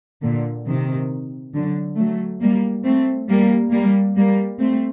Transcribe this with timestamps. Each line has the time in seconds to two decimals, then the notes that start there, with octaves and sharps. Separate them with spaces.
0.22 A#2 D3
0.66 C3 D#3
1.53 D3 F#3
1.97 F#3 A3
2.41 G3 A#3
2.85 A3 C4
3.29 G3 A#3
3.72 G3 A#3
4.16 G3 A#3
4.59 A3 C4